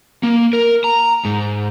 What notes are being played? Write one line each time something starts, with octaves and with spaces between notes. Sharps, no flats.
A#3
A#4
A#5
G#2